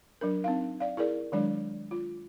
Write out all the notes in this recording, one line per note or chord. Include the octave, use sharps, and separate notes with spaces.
F#3 D4 A#4
C4 D#4 F5
D5 F5
E4 G#4 A#4 D5
D#3 F#3 G#3 D4 D5
F4